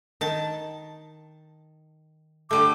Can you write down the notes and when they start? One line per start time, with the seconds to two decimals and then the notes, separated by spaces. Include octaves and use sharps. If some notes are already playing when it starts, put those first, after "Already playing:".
0.21 D#3 A5
2.51 D3 G3 A3 D6